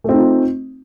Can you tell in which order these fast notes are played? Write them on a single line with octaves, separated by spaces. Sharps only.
A3 C4 D#4 F4